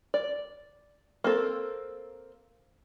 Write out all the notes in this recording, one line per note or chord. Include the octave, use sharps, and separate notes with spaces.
D5
A#3 C4 A4